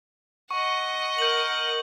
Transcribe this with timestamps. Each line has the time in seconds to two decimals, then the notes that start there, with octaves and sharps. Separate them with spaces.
0.51 D#5 F#5 C#6
1.18 A#4 G6 F#7